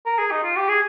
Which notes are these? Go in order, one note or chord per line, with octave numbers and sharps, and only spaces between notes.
A#4
G#4
D#4
F4
G4
G#4